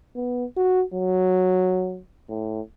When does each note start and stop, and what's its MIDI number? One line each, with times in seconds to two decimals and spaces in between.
0.16 0.45 59
0.57 0.83 66
0.94 2.00 54
2.30 2.61 45